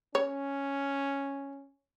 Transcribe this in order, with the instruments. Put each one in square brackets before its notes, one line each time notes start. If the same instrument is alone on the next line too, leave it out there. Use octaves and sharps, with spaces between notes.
[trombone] C#4 [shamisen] C#5